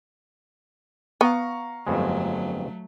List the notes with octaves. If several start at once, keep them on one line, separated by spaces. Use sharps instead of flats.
B3 F5 A#5 C#6
G1 F2 F#3 G#3 A3